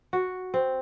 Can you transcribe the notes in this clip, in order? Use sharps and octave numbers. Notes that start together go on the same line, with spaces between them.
F#4
C4